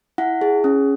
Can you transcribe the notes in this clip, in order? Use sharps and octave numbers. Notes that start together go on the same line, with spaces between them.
E4 F#5
G#4
C#4